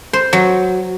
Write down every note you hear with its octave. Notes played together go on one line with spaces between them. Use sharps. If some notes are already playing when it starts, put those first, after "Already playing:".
C5
F#3